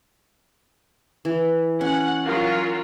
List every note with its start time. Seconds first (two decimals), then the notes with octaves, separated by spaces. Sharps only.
1.25 E3
1.81 C#4 F#5
2.24 F#3 F4 A#4